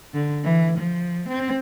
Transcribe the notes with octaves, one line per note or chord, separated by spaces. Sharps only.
D3
E3
F3
C4